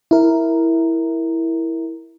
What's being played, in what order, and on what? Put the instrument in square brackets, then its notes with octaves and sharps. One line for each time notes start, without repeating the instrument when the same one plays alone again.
[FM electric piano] E4 A#4